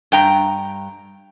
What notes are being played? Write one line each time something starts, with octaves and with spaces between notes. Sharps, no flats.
G2 G5 A#5